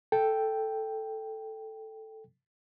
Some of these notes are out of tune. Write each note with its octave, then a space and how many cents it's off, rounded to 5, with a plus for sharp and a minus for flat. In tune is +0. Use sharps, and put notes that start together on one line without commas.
A4 +0 G5 +0